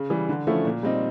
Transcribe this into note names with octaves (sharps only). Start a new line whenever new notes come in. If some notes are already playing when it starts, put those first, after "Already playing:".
Already playing: C#3
E3 G3
D3
F3 A3 C#4 E4
A#2
G3 C4 D#4